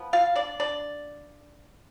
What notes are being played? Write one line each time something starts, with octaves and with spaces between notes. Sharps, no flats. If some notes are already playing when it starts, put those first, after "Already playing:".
Already playing: F3 B3
F4 F5
D4 D5
D4 D5